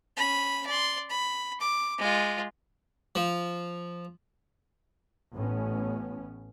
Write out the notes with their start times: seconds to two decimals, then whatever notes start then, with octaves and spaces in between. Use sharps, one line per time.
0.17 C#4 B5
0.67 D5 C6
1.10 B5
1.61 D6
1.98 G#3 F4
3.15 F3
5.33 A1 A2 B3 C#4